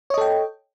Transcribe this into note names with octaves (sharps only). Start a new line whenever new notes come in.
A4 C#5 D#5 G5